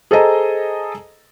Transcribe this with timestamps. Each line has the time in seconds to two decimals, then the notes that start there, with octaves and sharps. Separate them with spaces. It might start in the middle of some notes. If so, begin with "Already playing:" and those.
0.11 G#4 A4 C5 D#5 A#5